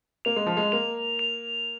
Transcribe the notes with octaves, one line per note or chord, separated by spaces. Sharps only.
A#3 F7
G#3
F3
G#3
A#3 F7
F7